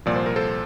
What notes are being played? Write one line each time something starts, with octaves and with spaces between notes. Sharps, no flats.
C2 A#2 F3 D5
C5
A#4
A4 C5